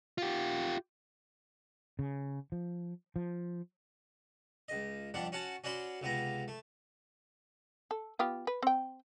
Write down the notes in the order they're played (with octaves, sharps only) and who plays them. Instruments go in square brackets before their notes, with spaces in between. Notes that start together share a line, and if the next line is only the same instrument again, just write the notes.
[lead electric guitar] F4 G4
[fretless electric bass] C#3
F3
F3
[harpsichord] C#2 D#5
F2 G3 D4 F#5
C#4 F#4 F#5 A5
C#4 F#4 D5 B5 C6
C#2 C3 B3 A#5
A3
[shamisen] A4
B3 F4 G4
B4
C4 G5